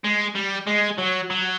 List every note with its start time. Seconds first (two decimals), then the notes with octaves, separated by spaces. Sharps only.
0.05 G#3
0.35 G3
0.67 G#3
0.98 F#3
1.30 F#3